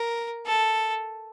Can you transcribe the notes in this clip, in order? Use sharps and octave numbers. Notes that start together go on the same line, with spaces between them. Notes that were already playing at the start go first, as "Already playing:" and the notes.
Already playing: A#4
A4